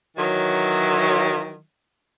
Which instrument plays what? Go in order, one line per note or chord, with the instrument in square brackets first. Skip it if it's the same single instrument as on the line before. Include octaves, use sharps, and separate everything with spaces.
[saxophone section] D#3 E3 F#3